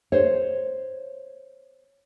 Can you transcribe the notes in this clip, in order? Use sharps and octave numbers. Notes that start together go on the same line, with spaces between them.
C5 C#5